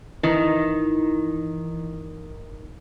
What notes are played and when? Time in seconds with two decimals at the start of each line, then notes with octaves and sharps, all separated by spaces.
0.23 G1 D#3 E3 D#4